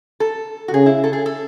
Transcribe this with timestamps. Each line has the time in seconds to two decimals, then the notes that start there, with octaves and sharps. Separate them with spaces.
0.20 A4
0.68 F#4
0.74 C#3 G#4
0.86 E4
1.04 A4
1.13 G#4
1.26 A4